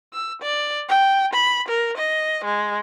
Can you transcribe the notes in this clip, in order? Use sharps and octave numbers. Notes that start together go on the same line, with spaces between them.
E6
D5
G5
B5
A#4
D#5
G#3